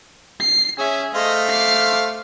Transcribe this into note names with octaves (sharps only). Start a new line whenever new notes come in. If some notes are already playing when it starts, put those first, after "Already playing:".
C7
C#4 G#4 E5
A3 C5 D#5 F5
D6 C7